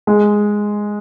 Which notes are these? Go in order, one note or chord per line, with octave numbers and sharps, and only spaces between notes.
G#3